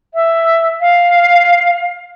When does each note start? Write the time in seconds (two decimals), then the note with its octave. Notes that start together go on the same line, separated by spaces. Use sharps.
0.14 E5
0.81 F5